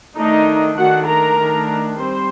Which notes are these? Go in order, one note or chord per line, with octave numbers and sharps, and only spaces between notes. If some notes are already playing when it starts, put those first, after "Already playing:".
D#3 A3 D4 D#4 D#5
D#3 A3 D4 F#4 F#5
A#4 A#5
D#3 A3 D4
G3 C4 C5 C6